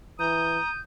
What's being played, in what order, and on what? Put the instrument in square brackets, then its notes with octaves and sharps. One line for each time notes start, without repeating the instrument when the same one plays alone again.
[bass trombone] E3 [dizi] A#5 [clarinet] D#6 [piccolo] G6